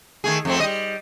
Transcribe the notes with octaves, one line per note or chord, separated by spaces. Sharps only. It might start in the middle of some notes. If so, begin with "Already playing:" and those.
D#3 A3 G#4
F2 A3 C4
G3 D#5